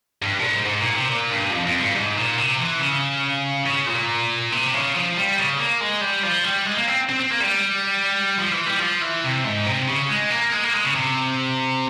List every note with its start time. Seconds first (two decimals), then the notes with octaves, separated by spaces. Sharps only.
0.22 G2
0.39 A#2
0.44 G#2
0.65 G#2
0.80 A#2
0.95 C3
1.09 A#2
1.30 G2
1.51 F2
1.65 F2
1.80 G2
1.95 G#2
2.16 A#2
2.38 C3
2.59 E3
2.80 C#3
3.66 C#3
3.87 A#2
4.52 C3
4.74 C#3
4.95 F3
5.17 G3
5.37 C#3
5.58 A#3
5.81 G#3
6.01 G3
6.23 F3
6.44 G3
6.65 G#3
6.77 A#3
6.88 C4
7.10 C4
7.20 C4
7.31 A#3
7.41 G3
8.38 F3
8.52 E3
8.67 G3
8.80 F3
9.02 E3
9.24 C3
9.44 G#2
9.66 C3
9.87 C#3
10.09 G#3
10.30 A#3
10.52 G#3
10.63 A#3
10.74 G#3
10.84 C#3
10.95 C3